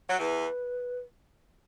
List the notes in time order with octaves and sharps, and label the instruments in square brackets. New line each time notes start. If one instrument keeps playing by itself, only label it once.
[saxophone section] F#3
[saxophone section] E2 E3 [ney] B4